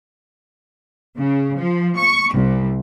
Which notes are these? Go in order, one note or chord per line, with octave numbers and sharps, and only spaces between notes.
C#3
F3
C#6
C2